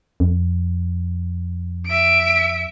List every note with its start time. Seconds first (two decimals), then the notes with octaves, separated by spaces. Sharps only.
0.20 F2
1.86 E5 D7